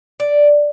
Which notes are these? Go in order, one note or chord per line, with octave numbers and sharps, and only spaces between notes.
D5